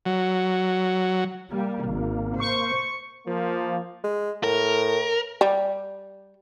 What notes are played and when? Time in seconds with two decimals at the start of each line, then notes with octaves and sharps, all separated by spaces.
0.06 F#3
1.51 G3 A#3
1.88 G#1
2.40 C5 C#6
3.27 F3 A#3
4.04 G#3
4.44 A2 A#4
5.41 G3